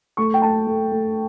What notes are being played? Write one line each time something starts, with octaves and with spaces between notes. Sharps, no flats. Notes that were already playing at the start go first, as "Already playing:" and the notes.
A3 C#6
G5
A3 A5
A3
A3